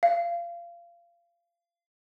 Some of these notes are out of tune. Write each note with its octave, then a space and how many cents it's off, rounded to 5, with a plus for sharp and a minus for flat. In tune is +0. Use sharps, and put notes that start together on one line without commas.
F5 -25